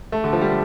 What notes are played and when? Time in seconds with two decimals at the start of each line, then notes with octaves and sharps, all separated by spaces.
0.12 A3
0.24 D3
0.33 F3
0.41 G3
0.49 A3